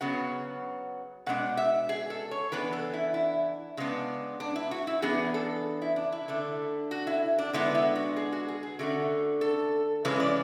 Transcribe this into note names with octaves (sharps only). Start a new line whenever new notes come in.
C#3 F#3 B3 F#5
B2 G#3 D4 F#5
E5
G#4
A4
C#5
E3 B3 D4 B4
A4
E4
E4
C#3 G#3 B3 D4
D4
E4
F#4
E4
E3 B3 D4 G#4
A4
E4
D4
E4
D3 A3 D4
F#4
E4
D4
D3 G#3 B3 D4 E4
E4
F#4
G#4
F#4
G#4
G#4
D3 A3 C#4 F#4
A4
C#3 E3 G#3 C#4 B4
D5